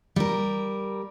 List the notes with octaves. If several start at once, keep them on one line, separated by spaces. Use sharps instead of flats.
G3 A#4